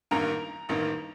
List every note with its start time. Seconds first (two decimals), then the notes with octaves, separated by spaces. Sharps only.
0.11 A1 G2 D#3 A#3 A#5
0.69 A1 G2 D#3 A#3